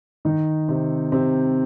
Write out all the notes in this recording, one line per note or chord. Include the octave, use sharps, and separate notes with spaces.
D#3 D#4
C3 C4
C3 C4